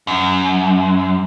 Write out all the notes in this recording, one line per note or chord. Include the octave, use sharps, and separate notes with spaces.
F#2